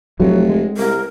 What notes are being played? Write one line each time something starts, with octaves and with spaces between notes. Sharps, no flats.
F1 A2 F#3 G#3
G#3
C2 A#4